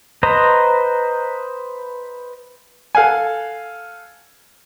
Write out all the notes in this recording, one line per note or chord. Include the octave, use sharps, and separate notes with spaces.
B4 C5 D#5 A#5
A4 F5 F#5 G#5